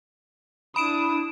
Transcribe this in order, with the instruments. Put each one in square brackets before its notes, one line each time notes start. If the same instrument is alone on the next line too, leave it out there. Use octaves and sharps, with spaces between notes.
[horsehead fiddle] D4 E4 [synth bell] B5 D7 E7 [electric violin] D#6